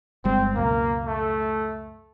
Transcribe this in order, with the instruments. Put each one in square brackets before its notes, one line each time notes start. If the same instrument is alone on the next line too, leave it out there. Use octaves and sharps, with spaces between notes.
[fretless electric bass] G1 G3 G#3 [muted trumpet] C4
[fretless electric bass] C#2 F#2 B2 [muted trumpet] A#3
[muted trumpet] A3